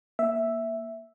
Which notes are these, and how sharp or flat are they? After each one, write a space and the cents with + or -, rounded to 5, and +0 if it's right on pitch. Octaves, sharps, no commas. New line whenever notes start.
A#3 +10 E5 +0